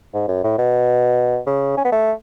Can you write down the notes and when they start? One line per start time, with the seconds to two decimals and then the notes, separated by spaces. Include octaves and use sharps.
0.14 G#2
0.28 F#2
0.44 A2
0.58 B2
1.47 C#3
1.77 C#4
1.85 B3
1.92 A3